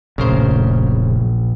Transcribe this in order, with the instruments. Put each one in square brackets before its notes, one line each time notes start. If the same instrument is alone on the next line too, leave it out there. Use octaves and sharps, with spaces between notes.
[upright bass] D1 F#2 [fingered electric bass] A#1 [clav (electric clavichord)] C#3 A#4 C5